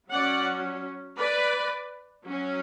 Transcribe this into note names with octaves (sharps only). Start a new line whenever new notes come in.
F#3 C#4 D5 F#5
B4 D5
F#3 C#4